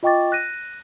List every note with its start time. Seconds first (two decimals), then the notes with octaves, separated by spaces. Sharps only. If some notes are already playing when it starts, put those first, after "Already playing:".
0.03 F4 D#5 G5 C#6 D6 A6
0.32 F#6 A#6 D#7